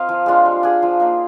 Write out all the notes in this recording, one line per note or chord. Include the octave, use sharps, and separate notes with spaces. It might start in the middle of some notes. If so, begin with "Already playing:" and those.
Already playing: C4 F4 A#4 D#5 F5
F3
G#3 D4 F4
G3
D4 G#4
F3
A#3 D#4 A#4